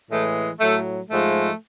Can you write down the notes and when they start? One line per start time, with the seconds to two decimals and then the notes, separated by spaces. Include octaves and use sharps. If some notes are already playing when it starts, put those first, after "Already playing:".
0.10 A2 E3 G#3 A3
0.60 A2 F#3 A3
1.10 G#2 F3 G#3 A3